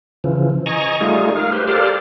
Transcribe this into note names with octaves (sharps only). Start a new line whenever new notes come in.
C#3 E3 F3
D#5 G#5 A#5 C#6
G3 A3 D#4 F4 G#4
A#4 F5
G4 B4 C5
G4 A4 A#4 C5 D5 F5